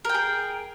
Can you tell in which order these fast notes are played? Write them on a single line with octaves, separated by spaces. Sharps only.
A#4 G5 G#4